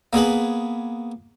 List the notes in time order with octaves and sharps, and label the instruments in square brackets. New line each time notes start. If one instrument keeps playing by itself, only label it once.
[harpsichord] A#3 B3 G#4 B4